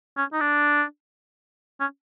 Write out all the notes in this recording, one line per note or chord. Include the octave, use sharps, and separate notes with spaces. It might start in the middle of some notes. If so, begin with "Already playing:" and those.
C#4
D#4
D4
C#4